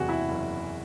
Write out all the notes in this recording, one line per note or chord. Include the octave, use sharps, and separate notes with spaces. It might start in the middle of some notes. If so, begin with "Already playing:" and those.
Already playing: F#1 E2 C3 F#4 G#4
E4
F#1